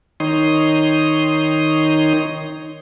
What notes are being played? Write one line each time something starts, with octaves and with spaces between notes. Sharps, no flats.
D#3 D#4 C#5 C6 D#6